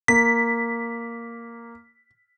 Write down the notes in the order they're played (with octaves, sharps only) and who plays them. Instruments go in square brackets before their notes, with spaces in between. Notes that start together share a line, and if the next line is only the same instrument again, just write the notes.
[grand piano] A#3 [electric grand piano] B6